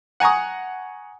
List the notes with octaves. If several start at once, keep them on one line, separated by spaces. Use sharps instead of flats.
F#5 G#5 A#5 C#6 D#6